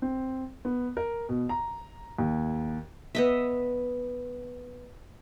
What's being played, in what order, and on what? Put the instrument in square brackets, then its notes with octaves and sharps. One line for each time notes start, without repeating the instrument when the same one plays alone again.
[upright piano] C4
B3
A#4
B2
A#5
D#2
[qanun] B3 D#5 E5